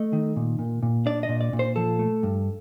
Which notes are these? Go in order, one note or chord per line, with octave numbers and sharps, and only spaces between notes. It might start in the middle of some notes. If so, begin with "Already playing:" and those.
Already playing: A3 D#5
D#3
A#2
A#2
A#2
D4 D5
D#5
A#2
D5
A#2
C5
F3 A4
A3
G2